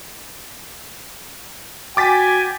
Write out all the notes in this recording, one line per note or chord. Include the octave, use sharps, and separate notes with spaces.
F#4 G5 G#5 D6 A6 B6